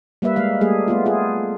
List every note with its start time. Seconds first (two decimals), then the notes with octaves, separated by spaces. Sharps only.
0.22 G3 A#3 B4 E5
0.36 G#3 A#3 F5
0.61 G3 A3 A#3 G#4
0.88 A3 B3 F4
1.05 F4 G#4